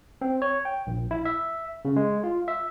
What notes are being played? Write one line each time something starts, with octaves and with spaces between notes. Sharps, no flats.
C4
C#5
G5
A#1
E4
E5
C#3
G#3
F4
E5